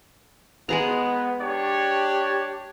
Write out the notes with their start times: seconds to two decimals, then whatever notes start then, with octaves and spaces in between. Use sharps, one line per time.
0.69 G#3 B3 G#4 A#5
1.41 D4 G4 C#5